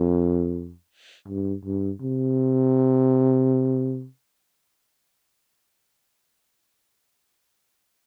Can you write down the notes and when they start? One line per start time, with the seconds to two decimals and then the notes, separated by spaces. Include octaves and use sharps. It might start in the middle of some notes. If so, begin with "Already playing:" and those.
Already playing: F2
1.28 G2
1.65 G2
2.01 C3